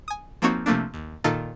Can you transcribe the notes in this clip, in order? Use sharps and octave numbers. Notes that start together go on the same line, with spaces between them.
G#5 D#6
F3 A#3 C4 D#4 F#4 C#5
C3 F3 A3 A#3 D4
D#2
A#2 D#3 D#4 F4 A4 A#4